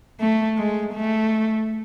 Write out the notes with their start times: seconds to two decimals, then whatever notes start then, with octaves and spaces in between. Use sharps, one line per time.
0.20 A3
0.58 G#3
0.94 A3